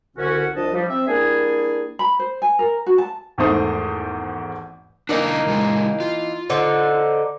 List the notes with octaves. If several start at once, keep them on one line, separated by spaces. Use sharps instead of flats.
C2 D3 C#4 F#4
C2 F3 D4 B4 D#5 A5
F3 G3
C4 E5
G3 A#3 D4 E4 G#4
B5
C5
G#5
A#4
F#4
A5
G#1 E2 G#2 A3 C5 D#6
E3 A#3 D4 D#4 A#4 D#5
C#3 G#3 G4
F4
D3 D#4 C5